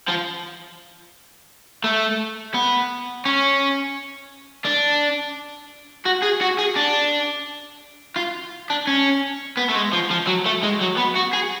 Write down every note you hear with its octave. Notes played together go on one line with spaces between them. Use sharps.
F3
A3
B3
C#4
D4
F#4
G#4
F#4
G#4
D4
F4
D4
C#4
B3
A3
G#3
F3
F3
F#3
A3
G#3
F#3
B3
F#4
G#4